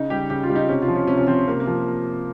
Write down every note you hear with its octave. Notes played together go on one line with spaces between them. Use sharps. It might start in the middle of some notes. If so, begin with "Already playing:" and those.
Already playing: C#3 D#4
G3 G4
C#3 G4
F4
G3
D#4
C3 C#4
F4
F3
C#4
C3 C#4
C#4
F3 C4
C3 A#3
A#3
F3